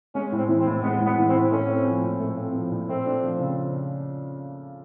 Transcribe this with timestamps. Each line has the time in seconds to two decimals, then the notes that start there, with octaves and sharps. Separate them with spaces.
0.15 G#3 C#4
0.32 A2
0.37 C4
0.49 E3
0.60 C4
0.66 A2
0.83 G#3 B3
1.00 A2
1.06 B3
1.18 E3
1.29 C4
1.34 A2
1.52 A3 C#4
1.69 C4
1.86 F3
2.04 A#2
2.20 A3
2.37 C4
2.55 F3
2.71 A#2
2.89 A3 C4
3.06 D4
3.23 F3
3.40 C#3